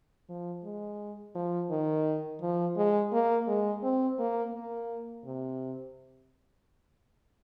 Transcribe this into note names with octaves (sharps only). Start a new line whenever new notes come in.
F3
G#3
F3
D#3
F3
G#3
A#3
G#3
C4
A#3
A#3
C3